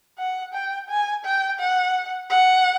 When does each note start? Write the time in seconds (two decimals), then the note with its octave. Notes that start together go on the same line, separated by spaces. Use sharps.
0.18 F#5
0.54 G5
0.89 G#5
1.25 G5
1.59 F#5
2.30 F#5